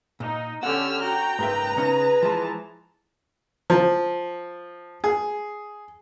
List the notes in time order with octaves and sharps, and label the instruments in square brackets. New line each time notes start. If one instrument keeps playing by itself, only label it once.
[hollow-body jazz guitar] A#2 [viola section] D#4
[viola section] D3 C#4 G4 [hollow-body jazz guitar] F#5 [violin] E6 F6
[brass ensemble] F#4 [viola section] G5 [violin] A#5
[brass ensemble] F#1 B4 [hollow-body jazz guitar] G#2 A#3 E5
[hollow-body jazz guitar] C#3 C#4 D#4 [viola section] G#4 [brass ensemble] B4
[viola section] E3 G#4 A5 [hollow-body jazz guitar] F3 G#3
[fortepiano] F3
G#4